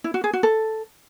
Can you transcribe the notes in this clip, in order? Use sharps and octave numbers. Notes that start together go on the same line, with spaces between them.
E4
F#4
G#4
F#4
A4